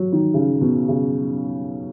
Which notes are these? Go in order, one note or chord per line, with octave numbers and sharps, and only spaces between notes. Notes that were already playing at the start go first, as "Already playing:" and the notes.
Already playing: F#3
D#3
C#3
B2
C#3